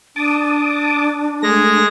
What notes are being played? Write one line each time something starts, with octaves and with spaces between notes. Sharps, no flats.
D4 A5 D6 D#6
G#3 A3 A#6